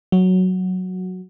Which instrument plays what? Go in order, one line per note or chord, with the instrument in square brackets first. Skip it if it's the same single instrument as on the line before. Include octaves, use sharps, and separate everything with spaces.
[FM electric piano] F#3